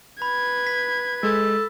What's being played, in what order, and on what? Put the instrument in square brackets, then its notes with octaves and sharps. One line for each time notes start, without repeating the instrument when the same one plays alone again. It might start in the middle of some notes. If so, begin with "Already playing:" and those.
[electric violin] B4 G#6 [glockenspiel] B5
[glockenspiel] B6
[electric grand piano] G#3 [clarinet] A4